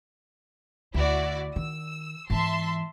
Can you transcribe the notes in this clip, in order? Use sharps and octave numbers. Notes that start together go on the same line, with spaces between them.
D2 E4 F#4 D5
D#3 E6
G#2 E3 E5 A5 C6